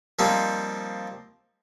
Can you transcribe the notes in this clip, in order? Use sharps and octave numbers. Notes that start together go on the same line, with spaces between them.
F3 G3 A#3 C4 D#4